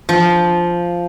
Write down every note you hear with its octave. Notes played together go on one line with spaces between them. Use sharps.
F3